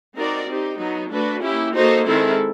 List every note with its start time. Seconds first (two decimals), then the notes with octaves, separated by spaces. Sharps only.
0.16 C4 D#4 F#4 A#4 D5
0.47 C4 D#4 G4
0.79 F#3 B3 D#4
1.11 A3 D4 F#4 B4
1.42 A#3 C#4 E4 G4
1.74 A#3 D#4 F#4 A4 C5
2.06 D#3 G#3 C4 E4 A4